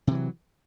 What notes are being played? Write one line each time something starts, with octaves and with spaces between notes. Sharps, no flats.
C3 E3 F#3